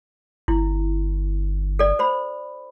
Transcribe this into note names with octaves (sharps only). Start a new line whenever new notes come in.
G1 E4
A4 D5
C5 B5